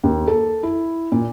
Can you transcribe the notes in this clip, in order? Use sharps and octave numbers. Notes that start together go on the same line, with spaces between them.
D#2
A4
E4
A#2